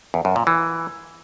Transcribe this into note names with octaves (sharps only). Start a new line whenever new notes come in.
E2
F#2
A#2
E3